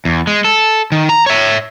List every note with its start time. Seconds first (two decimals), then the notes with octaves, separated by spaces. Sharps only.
0.05 E2
0.27 G#3
0.44 A4
0.92 D#3
1.09 A#5
1.26 C#5 E5